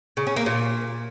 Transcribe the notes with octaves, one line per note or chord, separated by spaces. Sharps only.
C#3
C#4
A#3
A#2